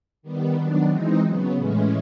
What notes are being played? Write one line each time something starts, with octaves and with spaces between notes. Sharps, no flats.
D#3 G3 B3
D#3 F#3 B3 D4
E3 G#3 C4 D#4
C#3 F#3 B3
A2 E3 G#3 C#4